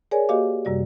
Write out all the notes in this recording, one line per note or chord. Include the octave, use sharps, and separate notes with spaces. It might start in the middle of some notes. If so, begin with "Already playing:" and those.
G#4 A#4 C#5 D5 G#5
A#3 F#4 G4 D#5 F5 D6
F#2 C3 G3 F#4 D5